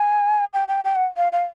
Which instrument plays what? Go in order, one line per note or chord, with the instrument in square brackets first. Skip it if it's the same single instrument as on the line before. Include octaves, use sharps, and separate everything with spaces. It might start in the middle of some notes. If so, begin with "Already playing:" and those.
Already playing: [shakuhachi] G#5
G5
G5
G5
F#5
F5
F5